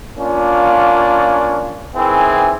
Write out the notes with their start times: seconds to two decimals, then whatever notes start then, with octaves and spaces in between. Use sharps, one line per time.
0.19 A#3 C#4 D4 F4
1.96 D#3 E3 C4 E4 G#4